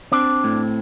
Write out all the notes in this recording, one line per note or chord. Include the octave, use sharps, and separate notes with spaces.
C4 D4 D5
A2